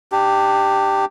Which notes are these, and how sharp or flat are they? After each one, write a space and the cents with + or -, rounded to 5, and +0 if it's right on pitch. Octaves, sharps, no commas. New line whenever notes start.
D4 +30 G4 +0